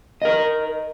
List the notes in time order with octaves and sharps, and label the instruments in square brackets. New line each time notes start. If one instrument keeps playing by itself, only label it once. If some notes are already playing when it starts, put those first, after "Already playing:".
[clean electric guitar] A#4 D#5